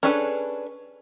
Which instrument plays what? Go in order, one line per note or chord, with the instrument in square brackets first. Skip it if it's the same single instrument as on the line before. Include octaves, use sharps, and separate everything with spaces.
[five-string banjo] C#4 D4 G#4 A4 B4